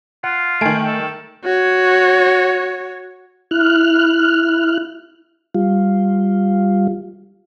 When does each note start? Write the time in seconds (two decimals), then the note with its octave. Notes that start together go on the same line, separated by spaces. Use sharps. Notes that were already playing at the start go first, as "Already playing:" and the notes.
0.24 F4 F#5
0.61 D#3 A3 G#5 D7
0.86 A4
1.44 F#4 C#5
3.51 E4 F6 F#6
5.54 G3 F4